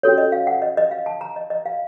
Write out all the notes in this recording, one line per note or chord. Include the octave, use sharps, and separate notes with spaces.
C#4 F#4 A4 C#5
D#5
F5
F#5
D#5
D#5
F5
A5
A#5
D#5
D#5
F5